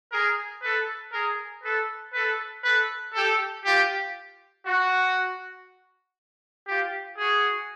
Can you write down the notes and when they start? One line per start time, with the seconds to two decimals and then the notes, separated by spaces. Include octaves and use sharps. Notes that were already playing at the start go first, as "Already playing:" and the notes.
0.11 G#4 A#4
0.62 A4 B4
1.13 G#4 A#4
1.63 A4 B4
2.14 A4 B4
2.64 A4 B4
3.15 G4 A4
3.66 F4 G4
4.66 F#4
6.68 F4 G4
7.18 F#4 G#4